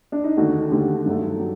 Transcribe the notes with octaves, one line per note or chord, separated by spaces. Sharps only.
D4
D#4
D#2 D3 A3 F#4
D#2 D3 A3 G4
G2 F#3 A3
F#3